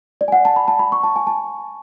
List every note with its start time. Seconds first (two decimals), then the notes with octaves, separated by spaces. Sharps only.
0.21 D5
0.28 G#5
0.32 F#5
0.45 A5
0.56 B5
0.68 A5
0.79 B5
0.92 C#6
1.03 A5
1.16 G#5
1.27 A5